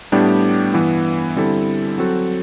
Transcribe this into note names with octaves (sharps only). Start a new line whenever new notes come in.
A2 G3 B3 D4 G4
G2 E3 B3
D3 G3 C4 E4 A4
F#3 C4 F#4 A4